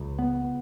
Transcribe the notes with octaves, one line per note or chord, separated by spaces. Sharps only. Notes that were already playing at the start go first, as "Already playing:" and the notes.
Already playing: C#2
B3